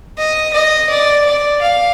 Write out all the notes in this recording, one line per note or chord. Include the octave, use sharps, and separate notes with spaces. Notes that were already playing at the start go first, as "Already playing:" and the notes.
D#5
D#5
D5
D5
F5